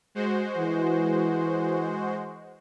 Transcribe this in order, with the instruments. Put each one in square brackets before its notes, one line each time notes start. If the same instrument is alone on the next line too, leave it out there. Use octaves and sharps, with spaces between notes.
[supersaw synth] G#3 F#4 C5
[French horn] E3